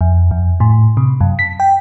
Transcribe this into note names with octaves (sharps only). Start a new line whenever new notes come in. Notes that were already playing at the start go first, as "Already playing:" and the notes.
F2
F2
A2
C3
F#2
B6
G5